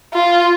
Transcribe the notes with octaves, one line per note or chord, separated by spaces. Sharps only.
F4